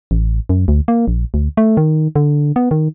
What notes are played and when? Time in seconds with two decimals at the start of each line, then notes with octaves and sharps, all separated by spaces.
0.11 A1
0.49 F#2
0.68 D2
0.88 A#3
1.08 A#1
1.34 D2
1.57 A3
1.77 D#3
2.16 D3
2.56 B3
2.71 D#3